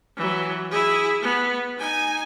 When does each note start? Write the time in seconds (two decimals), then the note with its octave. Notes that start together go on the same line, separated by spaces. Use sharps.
0.17 E3 F#3
0.71 E4 G#4
1.22 B3
1.77 D#4 G#5